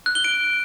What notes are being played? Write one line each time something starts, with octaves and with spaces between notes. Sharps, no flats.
F#6
G7
D7